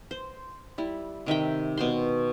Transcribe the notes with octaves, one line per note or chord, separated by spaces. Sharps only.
C5
G3 E4
C3 D#3 E5 G5
B2 C5 C6